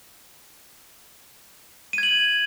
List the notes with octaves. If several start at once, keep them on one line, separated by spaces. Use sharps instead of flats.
G#6 D#7 F#7